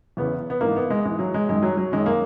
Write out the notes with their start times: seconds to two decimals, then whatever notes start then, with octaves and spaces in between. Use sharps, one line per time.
0.17 E2 C#3 E3 B3
0.50 B3
0.61 G#2 E3 A#3
0.76 B3
0.90 G#3
1.05 G#2 E3 G#3
1.19 F#3
1.34 G#3
1.49 F#2 D#3 G#3
1.63 F#3
1.77 F#3
1.92 F#2 D#3 G#3
2.06 A#3